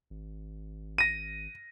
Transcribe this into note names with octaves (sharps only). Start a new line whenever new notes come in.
G#1
A#6 D#7